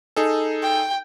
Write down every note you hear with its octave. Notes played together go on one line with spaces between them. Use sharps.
D#4 G#4 A4
G5